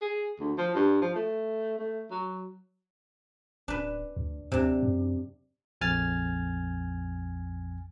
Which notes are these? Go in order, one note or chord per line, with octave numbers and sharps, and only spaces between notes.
G#4
D2
F3
G2
F3
A3
A3
F#3
D1 D4 B4
D2
D#2 C3 D4
F#2
A#1 F2 G#5 F6 A6